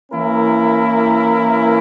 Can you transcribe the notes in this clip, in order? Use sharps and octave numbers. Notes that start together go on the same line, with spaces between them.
E3 A#3 C#4 E4 A#4